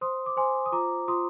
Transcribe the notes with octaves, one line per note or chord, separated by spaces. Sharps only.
C5 C6 D#6
D6
C5 G#5 C6
D#6
F4 A#5 D6
F4 C6 D#6